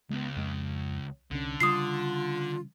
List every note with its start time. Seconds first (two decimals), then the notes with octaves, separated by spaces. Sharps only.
0.10 C#2 G#3 B3
0.36 F2 G#3
1.31 C2 D3 C#4
1.60 C#3 G3 F4 D#6 C7